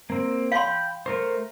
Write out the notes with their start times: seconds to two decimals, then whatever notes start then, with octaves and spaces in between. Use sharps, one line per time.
0.10 A#3 C4
0.52 F5 G5 B5 C6
1.06 A3 A#4 C5